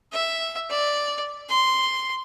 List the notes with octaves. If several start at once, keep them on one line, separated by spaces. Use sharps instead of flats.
E5
D5
C6